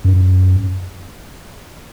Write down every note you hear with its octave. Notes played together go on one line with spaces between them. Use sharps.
F#2